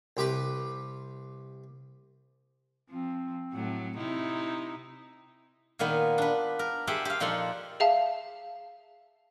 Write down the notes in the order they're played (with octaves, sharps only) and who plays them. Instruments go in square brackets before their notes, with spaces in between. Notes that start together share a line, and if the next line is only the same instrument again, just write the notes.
[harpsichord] C2 G4 B4
[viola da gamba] F3 [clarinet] C4
[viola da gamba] A2 F#3 A3
C3 D#4 E4
[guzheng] A#2 D#3 A#3 B3 D#4
D4 B4
A#4
G4 G#4 C5 E5 F#5 G5
G4 F5
A#2 F3 D#4 A4 F#5 C6
[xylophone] G#4 E5 F5 A5